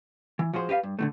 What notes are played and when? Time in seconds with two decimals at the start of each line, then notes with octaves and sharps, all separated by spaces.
0.39 E3
0.53 F3 F#4 G#4 C5
0.69 G4 B4 D#5 F5
0.83 G2
0.99 D3 D#3 A3